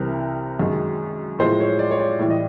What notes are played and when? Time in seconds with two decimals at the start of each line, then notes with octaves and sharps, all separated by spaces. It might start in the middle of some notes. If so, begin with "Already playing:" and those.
Already playing: C2 C3 E3 A#4
0.59 F#2 D#3 G#3
1.39 A2 F3 G#3 C5
1.60 C#5
1.79 D5
1.91 C#5
1.99 D5
2.19 A2 E3 G3
2.30 D#5